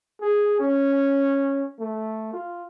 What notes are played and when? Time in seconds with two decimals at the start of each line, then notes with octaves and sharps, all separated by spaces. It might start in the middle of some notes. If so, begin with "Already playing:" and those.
0.21 G#4
0.60 C#4
1.80 A3
2.33 F4